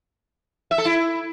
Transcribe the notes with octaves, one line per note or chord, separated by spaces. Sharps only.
E5
A4
E4